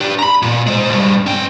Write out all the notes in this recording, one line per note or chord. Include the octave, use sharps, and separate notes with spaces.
D4 G4
A#5 B5
A#2
G#3 C5
B1 G2
C#4 G5